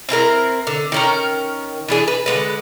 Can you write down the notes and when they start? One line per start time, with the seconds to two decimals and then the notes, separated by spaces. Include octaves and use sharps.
0.09 C4 E4 A4 A#4
0.67 D3
0.92 D#3 C#4 A#4
1.88 E3 D4 G#4
2.08 B4
2.26 D3 G#3 B4